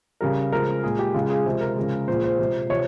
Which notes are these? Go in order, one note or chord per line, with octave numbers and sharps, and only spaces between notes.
C#3 G3 A#4
C#3 F3 G#3 A#4
A#2 G#3 G#4
G4
C#3 G#3 F4
G#4
C3 F3 G#3
A#4
C#3 F3 G#3
A#2 F3 G#3 C5
C5
C3 F3 G#3
C3 F3 C#5